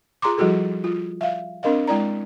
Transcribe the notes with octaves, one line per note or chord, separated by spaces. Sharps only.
F4 G#4 A#5 C6 D6
F3 G3 E4 F#4 G#4 A4
F4
E5 F5
C4 D4 A#4 D#5 F5
G#3 E4 D5 A#5